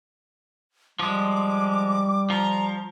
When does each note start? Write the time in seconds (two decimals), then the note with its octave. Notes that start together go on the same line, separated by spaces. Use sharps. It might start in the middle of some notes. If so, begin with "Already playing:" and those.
0.99 F3 G3 G#3 D6
2.30 F3 A#5